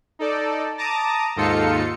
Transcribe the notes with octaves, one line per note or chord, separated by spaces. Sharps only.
D#4 A4 D5
A5 A#5 D6 D#6
D#2 G#2 D#4 F4 A4 C#7